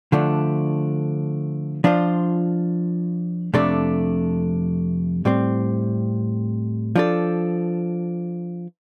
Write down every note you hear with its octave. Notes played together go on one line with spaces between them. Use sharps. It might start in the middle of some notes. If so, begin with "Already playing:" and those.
D3 F3 A3 D4
F3 D4 F4 C5
F2 C3 A3 D4 A4
A2 G3 C4
F3 D4 A4